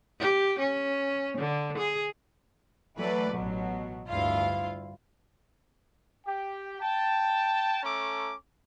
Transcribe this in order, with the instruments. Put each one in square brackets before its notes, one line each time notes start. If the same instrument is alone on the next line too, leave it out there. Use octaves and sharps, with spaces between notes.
[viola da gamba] G4
C#4
D3
G#4
[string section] E3 F#3 A3 B4 D5
A1 B2 F#3
D2 G2 E4 F4 F5
[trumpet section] G4 G5
G5 A5
A3 C#4 A4 A#5 D6